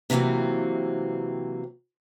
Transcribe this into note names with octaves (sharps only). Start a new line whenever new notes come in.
C3 E3 F#3 A#3 C4